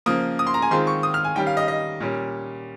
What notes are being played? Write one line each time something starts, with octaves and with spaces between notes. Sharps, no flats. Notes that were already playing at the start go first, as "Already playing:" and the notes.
C#3 F3 A#3 D#6
D#6
C6
A#5
G#5
D#3 G#3 C4 F4 C6
C#6
D#6
F6
G#5
D#3 G3 C#4 G5
F5
D#5
D#5
A#2 G3 C#4